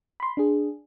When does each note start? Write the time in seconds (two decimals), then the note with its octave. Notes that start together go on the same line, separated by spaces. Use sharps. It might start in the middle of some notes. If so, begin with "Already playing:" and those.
0.20 B5 C6
0.37 D4 G#4